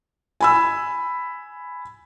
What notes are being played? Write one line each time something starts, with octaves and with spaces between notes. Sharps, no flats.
G#5 B5 E6